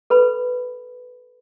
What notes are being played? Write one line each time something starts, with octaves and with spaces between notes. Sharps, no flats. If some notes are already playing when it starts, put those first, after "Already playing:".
A4 B4 B5